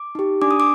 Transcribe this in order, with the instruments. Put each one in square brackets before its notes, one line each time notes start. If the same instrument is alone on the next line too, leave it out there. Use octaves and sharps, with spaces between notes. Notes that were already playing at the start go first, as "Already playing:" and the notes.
Already playing: [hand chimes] D6
D#4 G4
D4 D6
D#6
D6